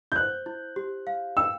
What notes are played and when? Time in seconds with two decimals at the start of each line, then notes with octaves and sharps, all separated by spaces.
0.12 G6
0.16 C5 F#6
0.46 E4
0.76 G4
1.07 F5
1.37 G5 E6